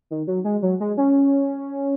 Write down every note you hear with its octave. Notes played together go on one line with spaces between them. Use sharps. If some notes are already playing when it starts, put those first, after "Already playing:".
D#3
F#3
G#3
F#3
G#3
C#4